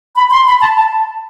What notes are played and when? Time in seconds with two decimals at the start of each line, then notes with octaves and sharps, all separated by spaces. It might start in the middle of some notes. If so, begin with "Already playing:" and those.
0.15 B5
0.30 C6
0.46 B5
0.60 A5
0.76 A5